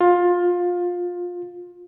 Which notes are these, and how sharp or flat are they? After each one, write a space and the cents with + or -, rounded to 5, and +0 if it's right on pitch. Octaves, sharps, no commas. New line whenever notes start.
F4 +20